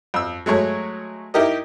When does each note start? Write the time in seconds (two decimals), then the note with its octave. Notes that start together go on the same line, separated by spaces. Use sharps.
0.14 F2 E6
0.46 F#3 G#3 A3 C#5
1.34 D#4 E4 G4 A#4 D#5